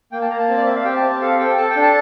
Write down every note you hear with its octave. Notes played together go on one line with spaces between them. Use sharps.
A#3 G5
A5
A#3 A#5
A5
C4
D5
C4 E5
F5
G4 G5
A5
C4
A5
A4 F5
A4 G5
A4 A5
G5
D4
A5